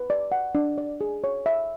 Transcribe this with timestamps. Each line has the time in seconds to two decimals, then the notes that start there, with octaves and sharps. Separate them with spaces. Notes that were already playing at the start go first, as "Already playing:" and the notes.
Already playing: B4
0.10 D5
0.32 F#5
0.55 D4
0.78 D5
1.01 G#4
1.24 C#5
1.46 E5